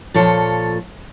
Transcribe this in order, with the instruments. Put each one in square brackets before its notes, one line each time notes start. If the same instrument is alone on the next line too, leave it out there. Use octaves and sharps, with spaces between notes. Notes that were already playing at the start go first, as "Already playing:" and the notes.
[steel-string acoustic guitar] A#2 F3 A4 C#5